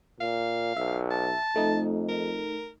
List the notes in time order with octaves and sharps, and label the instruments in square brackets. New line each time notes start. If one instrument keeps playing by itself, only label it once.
[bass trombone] A#2 [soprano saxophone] F5
[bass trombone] B1 [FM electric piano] E5
[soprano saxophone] A5
[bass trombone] F2 [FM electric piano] A3 D#4
[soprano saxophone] A#4